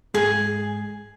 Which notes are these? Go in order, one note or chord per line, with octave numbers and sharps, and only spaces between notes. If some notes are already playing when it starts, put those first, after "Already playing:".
G#2 G#3 G#4